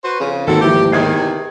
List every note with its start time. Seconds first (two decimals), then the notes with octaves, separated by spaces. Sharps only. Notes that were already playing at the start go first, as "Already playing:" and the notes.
0.04 F#4 B4 C5
0.20 F2 C#3
0.47 G#1 D2 D#3 A#3 C4 F#4 A4
0.61 E3 F3 G4
0.92 E2 C3 D#3 D#6 G#6 C7